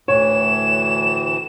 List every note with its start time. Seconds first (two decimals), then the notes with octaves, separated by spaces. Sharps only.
0.08 D2 A2 E3 C#5 E7